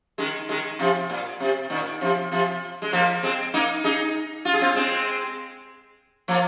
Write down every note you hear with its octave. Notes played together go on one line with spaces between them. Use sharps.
D#3 G#3
D#3 G#3
C3 F3
A#2
C3
A#2 D#3
C3 F3
C3 F3
G#3
F3 A#3
G#3 C4
A#3 D#4
D#4 G#4
F4
G#4
C4 F4
G#3 C4
F3 A#3